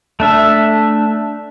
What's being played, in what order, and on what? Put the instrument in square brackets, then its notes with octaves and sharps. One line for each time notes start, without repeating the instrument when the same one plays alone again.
[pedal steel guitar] A3 D4 E5